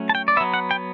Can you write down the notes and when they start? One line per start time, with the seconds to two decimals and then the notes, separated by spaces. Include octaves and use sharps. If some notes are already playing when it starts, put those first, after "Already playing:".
Already playing: F#3 A3 C#4
0.09 A5
0.15 G5
0.28 D5
0.37 B3 E5
0.41 F#3
0.54 F#5
0.71 G5